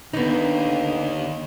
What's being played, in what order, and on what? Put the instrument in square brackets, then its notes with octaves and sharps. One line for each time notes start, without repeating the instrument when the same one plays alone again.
[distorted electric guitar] D#2 [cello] D3 [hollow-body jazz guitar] B3 D#4